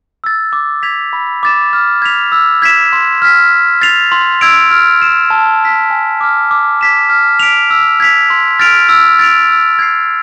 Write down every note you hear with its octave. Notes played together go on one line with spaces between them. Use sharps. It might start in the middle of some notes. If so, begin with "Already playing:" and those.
E6 A6
D6
G#6 B6 F7
B5
D6 A6 E7
F6
G#6 B6 F7
E6
G#6 B6 E7
C6
F6 B6
F6
A6 C7 F7
C6
E6 G#6 D7 F7
F6
A6 C7 E7
A5
E6 B6
G#5
D6 F6
D6
G#6 B6 E7
F6
B6 D7 F7
E6
G#6 B6 F7
C6
F6 A6 D7 F7
E6
A6 D7 F7
E6
G#6 C7